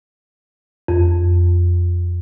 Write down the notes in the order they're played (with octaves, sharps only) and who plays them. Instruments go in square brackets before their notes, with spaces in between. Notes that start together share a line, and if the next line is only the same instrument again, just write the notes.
[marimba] F2